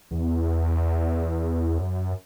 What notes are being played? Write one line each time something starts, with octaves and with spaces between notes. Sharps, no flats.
E2
F#2